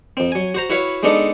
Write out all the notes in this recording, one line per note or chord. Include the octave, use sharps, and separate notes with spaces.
F2 C4
F#3 G#5
F#4 C5 A#5
E4 F#4 B4 C#5 F5
G#3 B3 D4 D#4 A4